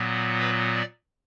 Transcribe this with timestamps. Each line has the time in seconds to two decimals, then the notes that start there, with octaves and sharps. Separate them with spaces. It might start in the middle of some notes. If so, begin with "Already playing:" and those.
Already playing: A#2 F#3 B3
0.39 B4
0.74 D5